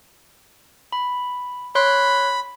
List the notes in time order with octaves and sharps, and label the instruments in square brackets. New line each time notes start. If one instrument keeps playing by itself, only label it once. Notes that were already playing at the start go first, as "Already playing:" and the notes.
[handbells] B5
[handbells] C#5 C6 F#6 [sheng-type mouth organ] B5